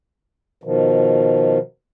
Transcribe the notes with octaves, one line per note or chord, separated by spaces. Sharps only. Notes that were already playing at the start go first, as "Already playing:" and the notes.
B2 D#3 F3